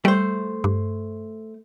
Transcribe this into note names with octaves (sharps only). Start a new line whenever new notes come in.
G3 A3 C5
G2